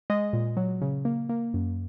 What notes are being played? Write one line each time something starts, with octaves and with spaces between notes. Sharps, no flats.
G#3 D#5
A#2
F#3
C#3
A#3
A#3
F#2